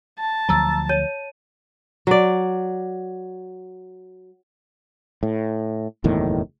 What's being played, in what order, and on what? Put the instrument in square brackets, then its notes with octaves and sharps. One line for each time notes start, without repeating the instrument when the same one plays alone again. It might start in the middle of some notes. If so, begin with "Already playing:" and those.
[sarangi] A5
[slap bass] D2 F3 F#3 [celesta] A#5 E6 A6
[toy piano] C#5 [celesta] D#7
[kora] F#3 D5
[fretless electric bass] A2
F#1 E2 A2 D#3